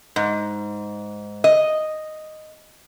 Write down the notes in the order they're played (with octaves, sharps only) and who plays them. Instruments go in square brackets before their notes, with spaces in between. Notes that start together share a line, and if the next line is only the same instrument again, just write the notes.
[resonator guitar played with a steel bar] G#2
D#5